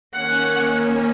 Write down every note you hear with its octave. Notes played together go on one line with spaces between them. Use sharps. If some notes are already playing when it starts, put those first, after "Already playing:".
D#3 A#3 C#4 F#5